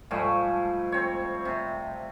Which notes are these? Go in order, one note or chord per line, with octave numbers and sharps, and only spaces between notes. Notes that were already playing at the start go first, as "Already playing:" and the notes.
G#2 F3 G3 A3
C4 C#5
C3